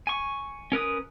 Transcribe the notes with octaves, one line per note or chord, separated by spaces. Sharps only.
G#5 C#6
C#4 A#4 B4 D#6